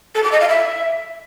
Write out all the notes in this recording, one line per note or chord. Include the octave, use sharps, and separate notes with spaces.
A4
D6
D#5
F5
E5